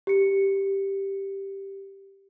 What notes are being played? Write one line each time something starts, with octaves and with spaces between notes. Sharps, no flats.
G4 C#7